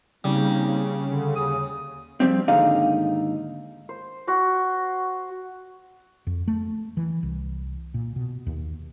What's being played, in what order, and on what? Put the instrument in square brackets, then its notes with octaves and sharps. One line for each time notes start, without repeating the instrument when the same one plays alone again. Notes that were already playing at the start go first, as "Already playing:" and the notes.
[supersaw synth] C#3 [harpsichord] G3 [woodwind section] A#3 C4 D#4
[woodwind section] D3
D#2 G#4 D#6
[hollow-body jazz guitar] F3 G3 C4
D#2 G#2 D3 D#4 F5
[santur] C5
F#4 C6
[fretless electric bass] F2
A3
E3
C2
A#2
B2
D#2